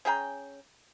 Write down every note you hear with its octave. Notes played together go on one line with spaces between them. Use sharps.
C#4 G#4 G5 A#5